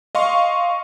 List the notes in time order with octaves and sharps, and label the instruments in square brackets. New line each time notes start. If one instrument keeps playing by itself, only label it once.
[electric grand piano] D#5 F5 C6 C#6